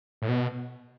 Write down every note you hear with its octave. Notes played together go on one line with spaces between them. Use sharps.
A2
B2